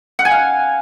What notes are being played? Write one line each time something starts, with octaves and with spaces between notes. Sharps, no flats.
F#5
G#5
F5